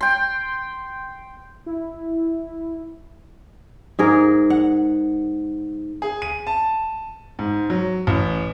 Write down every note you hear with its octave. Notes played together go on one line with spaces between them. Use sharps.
G5 C6
E4
G#2 G#4 A#4
F#5
G#4
D#7
A5
G#2
F#3
A1